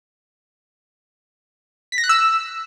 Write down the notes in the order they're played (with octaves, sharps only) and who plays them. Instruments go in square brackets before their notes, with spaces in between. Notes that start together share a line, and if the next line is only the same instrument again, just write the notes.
[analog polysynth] B6
A#6
F#6
E6